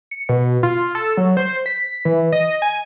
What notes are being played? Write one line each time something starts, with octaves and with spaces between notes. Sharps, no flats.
C#7
B2
F4
A4
F#3
C5
B6
E3
D#5
G#5